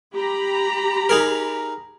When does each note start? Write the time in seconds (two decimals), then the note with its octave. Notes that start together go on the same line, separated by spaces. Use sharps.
0.14 G4 A#5 B5
1.09 D#4 G#4 A#4